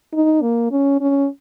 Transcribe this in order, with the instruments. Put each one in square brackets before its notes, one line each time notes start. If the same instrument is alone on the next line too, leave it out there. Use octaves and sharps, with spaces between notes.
[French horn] D#4
A#3
C#4
C#4